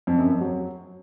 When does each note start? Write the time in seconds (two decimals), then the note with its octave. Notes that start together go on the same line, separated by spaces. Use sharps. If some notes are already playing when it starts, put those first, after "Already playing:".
0.07 F2
0.18 F#2
0.29 F2
0.41 F#3